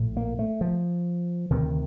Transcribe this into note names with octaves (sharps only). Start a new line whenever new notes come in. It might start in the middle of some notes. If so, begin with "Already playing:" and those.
Already playing: A#1 A2
A#3
A3
F3
D2 C3 D#3